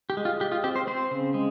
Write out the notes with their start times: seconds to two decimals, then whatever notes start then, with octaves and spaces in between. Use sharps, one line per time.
0.10 G4
0.17 G#3
0.25 F4
0.40 G#3 G4
0.52 F4
0.64 C4 G4
0.76 C5
0.87 C4 C5
1.11 C#3
1.34 G#3